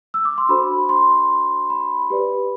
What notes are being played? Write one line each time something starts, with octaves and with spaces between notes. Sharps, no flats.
E6
D6
C6
D4 F#4 A4 C5 B5
C6
B5
G4 B4 D5